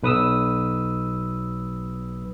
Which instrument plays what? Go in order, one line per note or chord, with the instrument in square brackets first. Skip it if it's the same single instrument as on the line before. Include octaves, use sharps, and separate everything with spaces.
[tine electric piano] B1 B4 D#6 E6